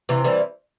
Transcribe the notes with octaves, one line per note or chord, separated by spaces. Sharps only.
C3 E3
E3 G3